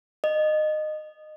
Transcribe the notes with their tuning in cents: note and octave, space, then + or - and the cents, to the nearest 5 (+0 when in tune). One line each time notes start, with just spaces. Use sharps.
D#5 -20